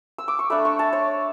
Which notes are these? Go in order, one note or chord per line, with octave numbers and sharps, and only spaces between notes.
E6
D6
C#6
A3 D4 B5
C#6
A5
C#5